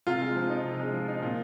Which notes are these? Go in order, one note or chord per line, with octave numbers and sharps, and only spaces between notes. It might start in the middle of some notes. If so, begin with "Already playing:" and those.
C3 F4
G#3
F3
D#4
C3
G#3
F3
D#4
A#2